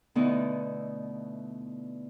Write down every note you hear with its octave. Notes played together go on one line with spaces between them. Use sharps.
B2 D3 A3 B3 D#4 E4